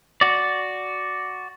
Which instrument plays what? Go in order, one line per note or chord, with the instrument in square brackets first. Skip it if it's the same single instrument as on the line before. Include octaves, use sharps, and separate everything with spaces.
[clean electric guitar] F#4 D5